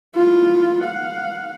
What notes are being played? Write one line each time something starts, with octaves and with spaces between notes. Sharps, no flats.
E4 F4
F5 F#5